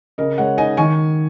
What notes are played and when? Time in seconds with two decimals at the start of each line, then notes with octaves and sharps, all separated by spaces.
0.18 C#3 A#4 D#5
0.38 G#3 C#5 F#5
0.58 D#4 D#5 G#5
0.77 D#3 G#5 C#6